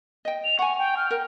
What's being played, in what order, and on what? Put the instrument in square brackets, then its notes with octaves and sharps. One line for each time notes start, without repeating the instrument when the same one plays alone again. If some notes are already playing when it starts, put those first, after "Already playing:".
[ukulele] D#5 G5
[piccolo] F7
[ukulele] F#5 G#5 [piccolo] C#6
[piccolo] G5
F6
[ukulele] A#4 [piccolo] G5